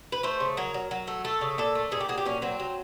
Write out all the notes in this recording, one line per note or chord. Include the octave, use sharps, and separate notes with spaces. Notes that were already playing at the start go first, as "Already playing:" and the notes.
B4
A3 C5
C#3
F#3 A#4
F#3
F#3
A3
A3 A4
C#3
A#2 A4
A3
A#2 G#4
G4
F#3 G#4
G4
A#2 C#4
F#3 C4
F#3